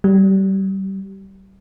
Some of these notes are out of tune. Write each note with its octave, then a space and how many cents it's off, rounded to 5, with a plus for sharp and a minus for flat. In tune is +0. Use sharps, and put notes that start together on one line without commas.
G3 -25